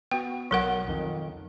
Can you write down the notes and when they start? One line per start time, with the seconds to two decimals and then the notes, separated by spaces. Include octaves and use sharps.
0.11 B3 F#4 G5
0.51 B1 F#3 A#4 F#5
0.88 F2 D#3